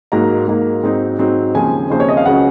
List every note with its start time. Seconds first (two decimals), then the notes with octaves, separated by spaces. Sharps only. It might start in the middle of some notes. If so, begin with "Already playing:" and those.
0.12 G#2 F#3 A#3 A#5
0.48 G#2 F#3 A#3
0.83 G#2 F#3 C4 D#4
1.19 G#2 F#3 C4 D#4
1.54 D#2 C#3 F3 C4 G#5
1.90 D#2 C#3 F3 C4 C5
2.00 C#5
2.08 D#5
2.17 F5
2.26 C#2 C#3 F#3 C#4 F#5